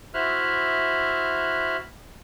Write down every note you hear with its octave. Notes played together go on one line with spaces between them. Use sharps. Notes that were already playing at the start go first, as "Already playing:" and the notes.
E4 F#4 C5 E5 F6 F#6